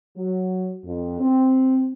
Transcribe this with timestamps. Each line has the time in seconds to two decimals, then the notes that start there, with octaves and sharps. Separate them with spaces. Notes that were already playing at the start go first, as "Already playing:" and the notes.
0.17 F#3
0.85 F2
1.20 C4